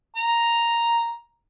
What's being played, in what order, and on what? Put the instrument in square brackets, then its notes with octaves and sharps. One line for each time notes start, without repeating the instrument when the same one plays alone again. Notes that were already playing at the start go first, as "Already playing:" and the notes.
[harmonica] A#5